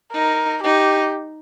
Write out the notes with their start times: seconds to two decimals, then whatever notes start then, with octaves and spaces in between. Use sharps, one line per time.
0.13 D#4 A#4
0.64 D#4 G4